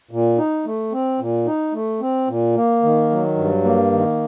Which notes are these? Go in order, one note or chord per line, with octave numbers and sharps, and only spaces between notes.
A#2
D#4
A3
C4
A#2
D#4
A3
C4
A#2
A#3
D#3
F#3
G2
A#3
D#3